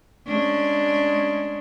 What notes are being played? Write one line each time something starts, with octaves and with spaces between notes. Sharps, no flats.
G#3 C#4 D4